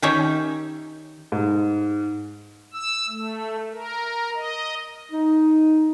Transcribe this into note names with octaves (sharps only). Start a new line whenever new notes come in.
D#3 C#4 D#4 G4 C#5 E5
G#2
E6
A3
A#4
D#5
D#4